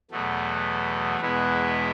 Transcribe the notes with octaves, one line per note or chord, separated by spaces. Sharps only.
E2 B2 F#3 A3
E2 B2 G#3 B3 E4